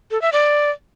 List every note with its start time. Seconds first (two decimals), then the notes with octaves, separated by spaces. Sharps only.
0.11 A4
0.22 E5
0.32 D5